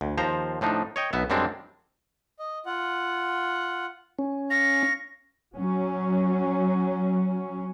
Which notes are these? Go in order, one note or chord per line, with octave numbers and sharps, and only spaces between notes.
D2
D#2 F3 C5 A#5
A2 F3 D4 D#4
C#5 D#5 G5
B1 B3 E5
F#2 G3 G#3 C4 D4
D#5
F4 F#5
C#4
F5 C#6 A#6
F#3 C#4